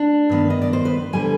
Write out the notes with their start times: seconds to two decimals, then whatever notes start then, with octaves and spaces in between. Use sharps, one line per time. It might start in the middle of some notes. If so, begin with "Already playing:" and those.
Already playing: D4
0.30 G2 D#3 B3
0.50 D#5
0.62 D5
0.73 C5
0.85 B4
1.13 D3 G3 B3 G#5